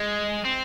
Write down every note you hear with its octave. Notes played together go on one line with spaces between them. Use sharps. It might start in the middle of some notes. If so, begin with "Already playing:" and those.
Already playing: G#3
C4